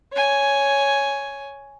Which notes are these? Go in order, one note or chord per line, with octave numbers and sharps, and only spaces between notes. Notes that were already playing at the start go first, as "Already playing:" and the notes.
C#5 G#5